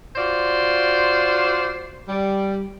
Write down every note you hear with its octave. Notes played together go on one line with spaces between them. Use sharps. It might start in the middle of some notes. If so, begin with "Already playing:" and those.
F4 F#4 C5 D5
G3